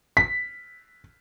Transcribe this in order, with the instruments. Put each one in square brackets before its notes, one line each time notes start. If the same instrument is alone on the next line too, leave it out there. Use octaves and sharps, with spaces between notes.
[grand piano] B6